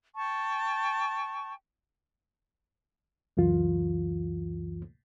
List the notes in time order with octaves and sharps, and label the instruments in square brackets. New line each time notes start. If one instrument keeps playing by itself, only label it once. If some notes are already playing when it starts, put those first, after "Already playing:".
[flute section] G5 A5 C#6
[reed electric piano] C#2 F#2 E3 F4